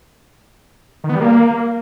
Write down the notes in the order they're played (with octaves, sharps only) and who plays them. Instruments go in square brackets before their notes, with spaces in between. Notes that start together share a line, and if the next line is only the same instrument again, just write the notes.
[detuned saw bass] D#3
B3
G3
A#3